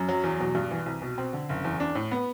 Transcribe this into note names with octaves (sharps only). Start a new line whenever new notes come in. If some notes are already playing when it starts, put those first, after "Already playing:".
Already playing: F#2
F#3
E2
B2
G2
E3
C2
B2
C4
D3
F#1
E2
D4
A2
B3